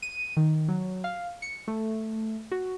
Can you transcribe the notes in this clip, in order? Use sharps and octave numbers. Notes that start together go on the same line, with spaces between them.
D#7
D#3
F#3
F5
C#7
A3
F#4